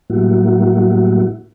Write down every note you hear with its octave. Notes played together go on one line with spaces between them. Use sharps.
A2 F#3 G3 A#3 E4 F#4